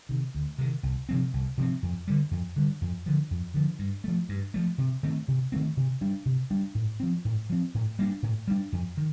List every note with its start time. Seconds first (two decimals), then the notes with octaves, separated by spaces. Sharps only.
0.09 C3 D#3
0.35 D2
0.58 C3 D#3
0.83 C2
1.09 C3 F3 C4
1.34 C2
1.58 C3 F3 C4
1.83 F2
2.08 D3 G3
2.31 F2
2.56 D3 G3
2.82 F2
3.06 D3 F3
3.31 F2
3.54 D3 F3
3.79 G2
4.04 F3 A3
4.29 G2
4.54 F3 A3
4.78 C3
5.03 D#3 A3 C4
5.28 C3
5.52 D#3 A3 C4
5.77 C3
6.01 G3 D4
6.25 C3
6.50 G3 D4
6.75 A2
7.00 F3 C4
7.25 A2
7.50 F3 C4
7.75 A2
7.99 G3 A#3 D4
8.23 A2
8.48 G3 A#3 D4
8.72 F2
8.97 D#3